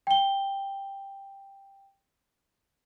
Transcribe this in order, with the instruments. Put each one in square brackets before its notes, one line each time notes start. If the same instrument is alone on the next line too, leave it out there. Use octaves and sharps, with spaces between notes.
[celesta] G5 G7